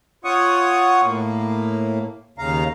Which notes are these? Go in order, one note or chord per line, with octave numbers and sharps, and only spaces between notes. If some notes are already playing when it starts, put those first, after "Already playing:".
F4 C#5 F#5 C#6 D#6
A2 A#3
D#2 C#3 F5 A#5